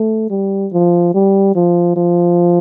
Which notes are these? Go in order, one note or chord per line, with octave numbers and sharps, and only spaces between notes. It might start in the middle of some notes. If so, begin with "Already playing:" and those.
Already playing: A3
G3
F3
G3
F3
F3